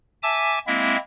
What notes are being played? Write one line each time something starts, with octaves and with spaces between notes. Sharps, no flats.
E5 G#5 A5 D6 E6
G#3 A#3 C4 E4 E5